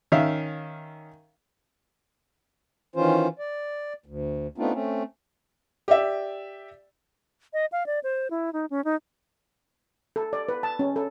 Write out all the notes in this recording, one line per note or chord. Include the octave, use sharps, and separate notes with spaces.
D#3 C#4 E5 F5
D#3 E3 C#4 F4 C5
D5
D2
A3 B3 C4 D4 D#4 F4
A3 C4 C#4
G4 D5 E5
D#5
F5
D5
C5
E4
D#4
C#4
D#4
A4
D5
B4
A5
C#4
A4